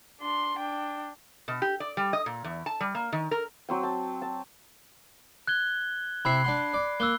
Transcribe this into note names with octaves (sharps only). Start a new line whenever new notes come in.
D4 C6
D4 G5
B2
G4
D5
G3
D#5
A#2
E2
A5
G3
A#3
D#3
A#4
F#3 C4 G5
A5
A5
F#6 G#6 G7
C3 E4 E5 B5 C7
D4 F#5 C6
D5
A#3 E6 F#6 G7